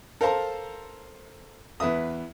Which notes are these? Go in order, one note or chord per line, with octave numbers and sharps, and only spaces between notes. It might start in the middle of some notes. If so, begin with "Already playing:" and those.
A4 A#4 C5 F5 A5 A#5
E2 B4 E5 D#6